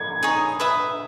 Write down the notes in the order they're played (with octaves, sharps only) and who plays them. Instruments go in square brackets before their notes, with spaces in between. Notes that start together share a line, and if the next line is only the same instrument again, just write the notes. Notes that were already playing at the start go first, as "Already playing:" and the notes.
Already playing: [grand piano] G#6
[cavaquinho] D#4 G#4 C#5
B4 E5 B5 D#6